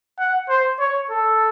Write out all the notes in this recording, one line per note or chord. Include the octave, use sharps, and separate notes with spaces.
F#5
C5
C#5
A4